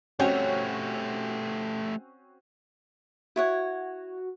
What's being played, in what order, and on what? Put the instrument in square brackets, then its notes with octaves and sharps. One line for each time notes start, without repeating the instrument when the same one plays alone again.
[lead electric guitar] A3 G4 [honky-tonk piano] C4 C#4 F#4 [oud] C#5
[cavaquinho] E4 C#5 F#5 [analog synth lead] F#4